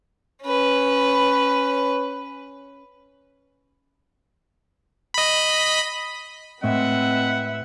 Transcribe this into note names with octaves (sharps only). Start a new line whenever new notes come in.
C#4 B4
D#5 B5
A2 G#3 C4 B4 E5 F#5